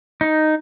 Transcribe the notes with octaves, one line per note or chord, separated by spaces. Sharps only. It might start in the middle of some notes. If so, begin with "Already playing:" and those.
D#4